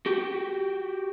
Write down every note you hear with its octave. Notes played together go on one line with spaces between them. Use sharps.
F#4 G4